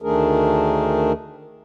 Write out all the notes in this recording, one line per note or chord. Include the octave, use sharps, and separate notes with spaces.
D2 D#3 A3 D4 G#4 A#4